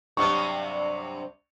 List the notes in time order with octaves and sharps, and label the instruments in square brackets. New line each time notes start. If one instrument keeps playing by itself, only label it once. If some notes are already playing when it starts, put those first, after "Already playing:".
[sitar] G2 C3 F#3 [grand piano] C#6